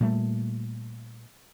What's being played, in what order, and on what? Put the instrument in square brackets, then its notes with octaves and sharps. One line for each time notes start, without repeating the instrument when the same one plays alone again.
[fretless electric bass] A#2 G3 A3